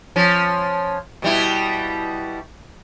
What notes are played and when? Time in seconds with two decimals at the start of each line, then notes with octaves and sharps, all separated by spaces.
0.16 F3 C#4
1.22 B2 G3 E4